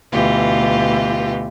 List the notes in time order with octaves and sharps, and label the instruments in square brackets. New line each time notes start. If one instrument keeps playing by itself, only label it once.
[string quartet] D2 B2 E3 F4 G4